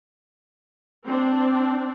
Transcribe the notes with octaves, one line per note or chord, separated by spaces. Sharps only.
C4 D4